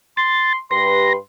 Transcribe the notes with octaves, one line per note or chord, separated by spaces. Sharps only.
C6 A6
G2 G4 B4 C6 A#6